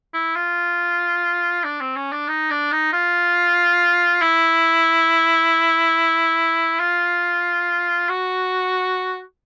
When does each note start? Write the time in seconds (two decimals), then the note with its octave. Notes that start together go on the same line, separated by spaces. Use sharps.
0.14 E4
0.36 F4
1.64 D4
1.81 C4
1.96 C#4
2.12 D4
2.28 D#4
2.50 D4
2.72 D#4
2.93 F4
4.22 E4
6.80 F4
8.09 F#4